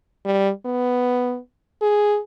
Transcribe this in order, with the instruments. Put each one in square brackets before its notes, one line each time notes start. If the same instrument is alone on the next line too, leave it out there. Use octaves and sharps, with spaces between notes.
[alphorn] G3
B3
G#4